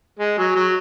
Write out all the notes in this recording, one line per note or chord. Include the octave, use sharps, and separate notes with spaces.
G#3
F#3
F#3